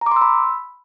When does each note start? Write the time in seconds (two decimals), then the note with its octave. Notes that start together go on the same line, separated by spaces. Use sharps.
0.01 A#5
0.06 D6
0.11 C6
0.16 E6
0.21 B5